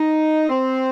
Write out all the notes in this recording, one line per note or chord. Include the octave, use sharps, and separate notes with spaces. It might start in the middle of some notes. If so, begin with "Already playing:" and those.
Already playing: D#4
C4